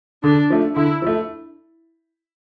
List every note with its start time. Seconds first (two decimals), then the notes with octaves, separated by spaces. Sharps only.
0.24 D3 D4
0.50 F3 A3
0.76 D3 E4
1.02 F3 A3